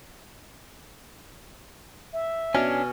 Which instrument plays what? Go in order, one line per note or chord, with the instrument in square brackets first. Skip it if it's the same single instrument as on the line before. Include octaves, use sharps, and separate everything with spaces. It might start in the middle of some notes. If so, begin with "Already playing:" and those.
[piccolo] E5
[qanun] B2 [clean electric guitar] C#4 D4 [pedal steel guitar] G#5 F6